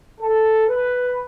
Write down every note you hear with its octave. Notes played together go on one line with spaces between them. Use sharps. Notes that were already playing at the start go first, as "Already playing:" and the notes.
A4
B4